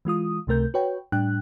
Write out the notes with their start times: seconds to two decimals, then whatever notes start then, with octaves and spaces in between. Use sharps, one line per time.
0.05 E3 G#3 F4 D#6
0.47 C#2 C3 A3 A#4 G6
0.74 F#4 B4 C#5 G5
1.12 A2 G3 D4 G5 F#6